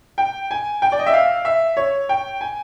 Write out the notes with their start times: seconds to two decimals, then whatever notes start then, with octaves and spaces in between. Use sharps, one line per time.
0.18 G5
0.51 G#5
0.82 G5
0.92 D5
0.99 D#5
1.07 E5
1.13 F5
1.45 E5
1.77 C#5
2.09 G5
2.41 G#5